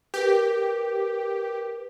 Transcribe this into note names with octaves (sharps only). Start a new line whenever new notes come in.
G4 A#4 B4